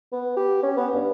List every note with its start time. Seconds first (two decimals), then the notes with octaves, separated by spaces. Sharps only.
0.12 B3
0.37 G4
0.63 C#4
0.77 B3
0.94 G2